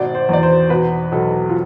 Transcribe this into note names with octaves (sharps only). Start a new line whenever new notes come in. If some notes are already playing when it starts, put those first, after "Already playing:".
Already playing: G#1 B2 D5
C5
E2 D5
C5
B2 B4
B1 A4
F4